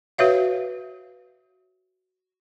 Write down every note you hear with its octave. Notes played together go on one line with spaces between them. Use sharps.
F#4 B4 C#5 E5 F5